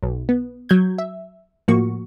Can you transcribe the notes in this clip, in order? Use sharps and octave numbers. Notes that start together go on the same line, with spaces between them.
B1
B3
F#3 G6 G#6
E5
A2 F3 A#3 F#4 C#6